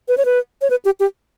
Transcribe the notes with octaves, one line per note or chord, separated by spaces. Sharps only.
B4
C#5
B4
C#5
B4
G4
G4